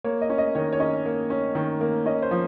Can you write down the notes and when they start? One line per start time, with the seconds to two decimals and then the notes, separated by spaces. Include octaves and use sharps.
0.04 A#3 C#5
0.21 D#5
0.30 C#4
0.38 D#5
0.55 D#3 C#5
0.73 C#5
0.80 C#4 D#5
1.06 A#3
1.30 C#4
1.55 D#3
1.81 A#3
2.06 C#4 D#5
2.22 C5
2.31 F3